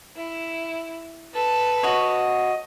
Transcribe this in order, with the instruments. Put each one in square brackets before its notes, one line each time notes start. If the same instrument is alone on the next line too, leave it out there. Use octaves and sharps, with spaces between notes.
[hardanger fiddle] E4
A4 B4
[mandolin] F#4 C#5 [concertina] D#5